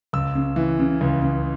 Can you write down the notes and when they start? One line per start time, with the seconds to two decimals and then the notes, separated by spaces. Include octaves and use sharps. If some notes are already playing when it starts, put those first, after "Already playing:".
0.13 C#2 E6
0.35 C#3
0.56 E3
0.79 C#3
1.01 C#2
1.22 C#3